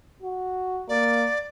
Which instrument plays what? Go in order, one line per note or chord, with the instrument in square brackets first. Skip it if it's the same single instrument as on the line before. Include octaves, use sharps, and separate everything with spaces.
[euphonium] F#4
[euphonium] A#3 [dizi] D5